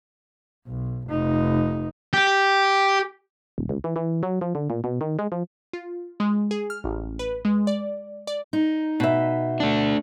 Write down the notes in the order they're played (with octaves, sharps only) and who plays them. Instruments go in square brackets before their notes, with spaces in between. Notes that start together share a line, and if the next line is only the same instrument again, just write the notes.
[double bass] B1
F1 D#4
[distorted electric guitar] G4
[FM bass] D#1
C#2
E3
E3
F#3
F3
D3
A#2
B2
D#3
G#3
F3
[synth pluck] F4
G#3
G#4
F6
A1
B4
G#3
D5
D5
[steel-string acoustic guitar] D#4
[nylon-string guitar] B2 E5
[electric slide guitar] A3 D4